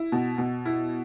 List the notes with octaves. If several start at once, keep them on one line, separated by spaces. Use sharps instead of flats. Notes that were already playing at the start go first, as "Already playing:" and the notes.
Already playing: E4
B2
B2
E4